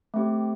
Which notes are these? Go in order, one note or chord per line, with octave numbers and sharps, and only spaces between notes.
A3 C4 G4